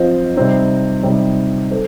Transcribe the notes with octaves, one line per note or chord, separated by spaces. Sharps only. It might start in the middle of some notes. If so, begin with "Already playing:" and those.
Already playing: F3 C4 F4 C5 D#5
C3 G3 C4 D#4
C3 G3 C4 D#4
A4 C5